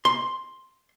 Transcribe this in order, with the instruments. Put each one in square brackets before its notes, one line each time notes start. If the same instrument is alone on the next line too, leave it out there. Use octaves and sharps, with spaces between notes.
[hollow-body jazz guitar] C6